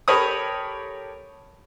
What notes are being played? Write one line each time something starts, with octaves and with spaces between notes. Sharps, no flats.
G4 A4 A#4 C#5 B5 D#6